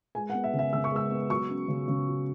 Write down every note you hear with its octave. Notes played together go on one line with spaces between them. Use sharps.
G#3 G#5
F#5
B3
E5
C#3
E5
C#3 E6
C#6
G#3 E6
B3
F#3 C#6
C#4
C#3
C#3
F#3